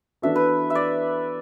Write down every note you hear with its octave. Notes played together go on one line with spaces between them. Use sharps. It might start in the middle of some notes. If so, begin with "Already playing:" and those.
E3 B3 D4 F#4 A4 E5
B4
E5
D5